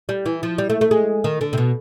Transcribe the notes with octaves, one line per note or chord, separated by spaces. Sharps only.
G3
E3
F3
G3
A3
A3
G#3
D#3
D3
C3
B2